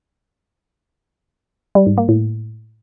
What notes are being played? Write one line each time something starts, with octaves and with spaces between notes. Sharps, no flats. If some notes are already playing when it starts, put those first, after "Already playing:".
G3
G#2
A#3
A2